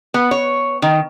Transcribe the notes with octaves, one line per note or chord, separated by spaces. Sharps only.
B3
C#5
D#3